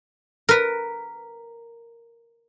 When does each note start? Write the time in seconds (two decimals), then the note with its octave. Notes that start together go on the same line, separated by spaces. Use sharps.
0.49 A#4 B4